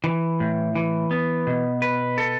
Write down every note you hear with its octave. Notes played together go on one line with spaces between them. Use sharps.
E3
A2
E3
B3
B2
B4
A4